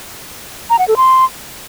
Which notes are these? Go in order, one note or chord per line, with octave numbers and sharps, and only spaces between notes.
A#5
F#5
A4
C6